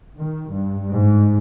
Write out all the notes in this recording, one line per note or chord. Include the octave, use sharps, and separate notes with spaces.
D#3
G2
G#2